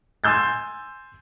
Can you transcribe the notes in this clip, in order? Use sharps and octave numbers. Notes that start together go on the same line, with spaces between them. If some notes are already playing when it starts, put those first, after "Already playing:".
G#5 C6 E6 G6 A6